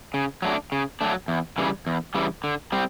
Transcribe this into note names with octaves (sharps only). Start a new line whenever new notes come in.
C#3
F#3 A3 D4
C#3
F#3 A3 D4
E2
C#3 E3 G3
E2
C#3 E3 G3
D3
G3 C4